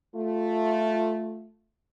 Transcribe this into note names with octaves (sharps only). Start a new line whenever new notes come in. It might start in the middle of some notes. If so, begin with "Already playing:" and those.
A3 F4